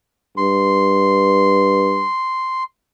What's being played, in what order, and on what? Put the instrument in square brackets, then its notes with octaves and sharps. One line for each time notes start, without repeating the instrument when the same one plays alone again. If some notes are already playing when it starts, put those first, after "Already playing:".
[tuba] G2 [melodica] C6